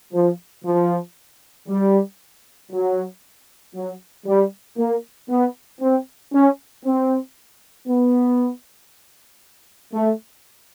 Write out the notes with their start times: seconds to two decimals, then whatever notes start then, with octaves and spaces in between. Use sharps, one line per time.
0.13 F3
0.65 F3
1.68 G3
2.71 F#3
3.75 F#3
4.27 G3
4.78 A#3
5.29 B3
5.81 C4
6.33 C#4
6.84 C4
7.87 B3
9.94 A3